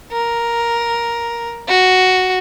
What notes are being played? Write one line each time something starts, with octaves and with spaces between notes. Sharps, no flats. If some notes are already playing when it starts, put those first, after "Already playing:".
A#4
F#4